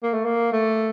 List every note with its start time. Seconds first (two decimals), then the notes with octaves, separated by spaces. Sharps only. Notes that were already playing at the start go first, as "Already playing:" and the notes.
0.03 A#3
0.14 A3
0.25 A#3
0.52 A3